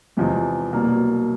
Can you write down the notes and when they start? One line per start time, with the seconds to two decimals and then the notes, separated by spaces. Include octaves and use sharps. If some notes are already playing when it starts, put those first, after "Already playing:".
0.17 E2 C3 F3 G#3
0.72 C2 B2 F#3 A#3